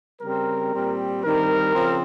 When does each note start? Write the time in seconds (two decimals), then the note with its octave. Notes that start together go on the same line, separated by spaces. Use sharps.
0.21 C#3 G3 C4 A#4
0.72 A#2 G3 C4
1.23 G2 D#3 G3 C4 A#4
1.74 C#3 F3 C4